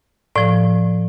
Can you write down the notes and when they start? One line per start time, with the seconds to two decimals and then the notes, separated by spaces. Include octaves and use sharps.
0.35 A2 F3 D5